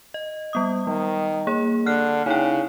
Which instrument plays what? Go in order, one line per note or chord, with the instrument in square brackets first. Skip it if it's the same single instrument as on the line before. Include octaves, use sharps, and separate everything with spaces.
[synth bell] D#5
G3 B3 D#6
[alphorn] D#3 [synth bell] G3
[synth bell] A#3 G#4 C#5
[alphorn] D3 [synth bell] F6 F#6 C7
[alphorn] C#3 [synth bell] D#4 E4 G5